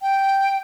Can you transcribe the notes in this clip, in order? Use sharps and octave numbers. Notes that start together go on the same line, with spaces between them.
G5